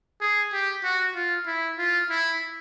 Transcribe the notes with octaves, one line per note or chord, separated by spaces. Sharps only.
G#4
G4
F#4
F4
E4
F4
E4